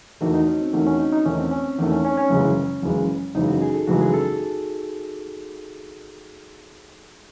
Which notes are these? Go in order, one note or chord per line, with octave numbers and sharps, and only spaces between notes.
E2 D#3 A3 F#4
D#4
C#4
C4
E2 D#3 A3 C#4
C#4
D#4
D#4
E2 D#3 A3 C#4
C4
C#4
E2 D#3 A3 D#4
C#4
C#4
C#4
F#1 F#2 C#3 E3 G#3
F#1 F#2 C#3 E3 G#3
F#1 F#2 C#3 E3 G#3 D#4
F#4
G#4
A4
F#1 F#2 C#3 E3 G#3 F#4
G#4
A4